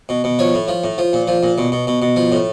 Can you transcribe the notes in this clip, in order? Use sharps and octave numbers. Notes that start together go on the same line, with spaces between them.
B2
B2
F3 C#5
A2
F3
A2
F3
A#2
F3
A#2
B2
B2
B2
B2
F3
A2